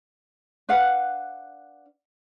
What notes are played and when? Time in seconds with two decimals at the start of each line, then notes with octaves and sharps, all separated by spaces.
0.69 D4 B4 F5 F#5